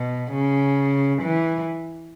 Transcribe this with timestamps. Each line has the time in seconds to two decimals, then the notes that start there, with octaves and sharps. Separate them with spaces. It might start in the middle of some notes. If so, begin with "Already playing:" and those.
Already playing: B2
0.32 C#3
1.21 E3